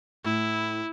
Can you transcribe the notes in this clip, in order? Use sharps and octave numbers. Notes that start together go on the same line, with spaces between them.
A2 E4